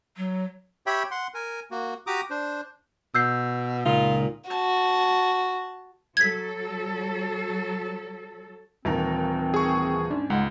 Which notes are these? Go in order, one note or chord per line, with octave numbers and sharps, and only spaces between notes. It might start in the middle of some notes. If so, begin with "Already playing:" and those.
F#3
G4 C#5 E5 G5 B5
F#5 C6
A#4 G#5
A#3 F#4
F#4 G4 A#5 D6 D#6
D4 C5
B2 E6 G6 C7
C#2 A#2 D#4 F4
F#4 A5
F#3 A4 G#6 B6
D#1 D#2 E3 C4 A#4
G#4 C#6
G#2 C#4 D4
C#2 G#3 F#5